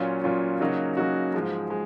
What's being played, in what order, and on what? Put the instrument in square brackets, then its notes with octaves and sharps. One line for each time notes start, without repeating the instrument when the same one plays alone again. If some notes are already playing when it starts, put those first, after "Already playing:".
Already playing: [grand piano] A#2 F#3 C#4 F4
A#2 F#3 C#4 F4
C#3 F#3 A#3 D#4 F#4
C#3 F#3 A#3 D#4 F#4
G#2 F3 G#3
G#3